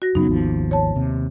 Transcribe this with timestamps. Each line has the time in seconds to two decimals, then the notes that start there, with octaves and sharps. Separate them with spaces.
0.02 F#4 A#6
0.15 F#2 C#3 F#3 B3 D#4
0.27 G#1 D#2 F3
0.71 C#5 A5
0.95 D#2 C3